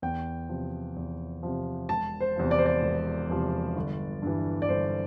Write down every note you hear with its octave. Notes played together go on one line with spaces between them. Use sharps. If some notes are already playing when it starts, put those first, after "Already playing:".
E2 G5
C3 F3
E2
C3 F3
E1 A5
C5
E2 C3 F3
D5
C5
D5
E1
E2 C3 F3
G1
G2 E3
D5
G1 C5